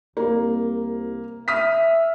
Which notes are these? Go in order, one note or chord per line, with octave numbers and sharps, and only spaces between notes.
C2 A#3
E5 D#6 F6 B6